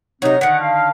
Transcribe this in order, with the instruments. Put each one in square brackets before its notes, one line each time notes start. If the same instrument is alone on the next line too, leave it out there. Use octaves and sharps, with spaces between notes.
[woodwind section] C3 C4 D#4 [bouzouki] F#3 A#4
[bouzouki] D3 D#3 [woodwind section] F#5
[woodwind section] F5